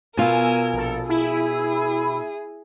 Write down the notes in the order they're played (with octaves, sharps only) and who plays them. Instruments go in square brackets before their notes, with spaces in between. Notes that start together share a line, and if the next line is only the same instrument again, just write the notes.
[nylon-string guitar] B2 F4 [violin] A#4 [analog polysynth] G#5 E6
[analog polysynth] A#1 A4
[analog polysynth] E4 [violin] G#4